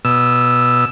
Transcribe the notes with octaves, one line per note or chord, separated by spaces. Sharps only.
B2 E6